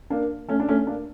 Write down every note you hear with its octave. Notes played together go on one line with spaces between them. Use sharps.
A#3 D4
A3 C#4
D4
A3 C#4
A#3 D4